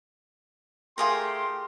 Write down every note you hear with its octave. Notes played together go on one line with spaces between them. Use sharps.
A3 F4 G4 G#4 A#4 C6